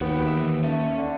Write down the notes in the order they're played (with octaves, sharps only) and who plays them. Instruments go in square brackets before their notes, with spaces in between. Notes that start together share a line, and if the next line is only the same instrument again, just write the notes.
[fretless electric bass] D#2 [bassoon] B3 [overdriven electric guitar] F#4 G4
[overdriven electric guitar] E5 G5
E3
[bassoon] A3 [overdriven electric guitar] C#4
[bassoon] D3